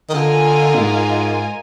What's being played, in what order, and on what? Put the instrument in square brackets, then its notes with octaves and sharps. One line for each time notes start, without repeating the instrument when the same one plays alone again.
[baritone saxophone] D#3
[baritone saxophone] D3 [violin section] F4 A#4 D#5 G#5
[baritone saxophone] A#2
G#2